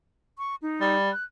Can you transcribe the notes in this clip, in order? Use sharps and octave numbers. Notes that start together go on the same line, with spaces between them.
C#6
D#4
G3
F#6